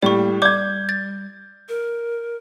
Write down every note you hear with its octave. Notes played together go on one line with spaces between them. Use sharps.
A2 G3 A#3 D5 C#6
G3 D5 D6 G6 G#6
A6
A#4